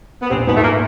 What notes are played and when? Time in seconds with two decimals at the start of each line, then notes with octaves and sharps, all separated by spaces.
0.23 B3
0.30 A#1 C3 C4
0.47 G#2 B2 B3
0.57 A3
0.63 A#2 A#3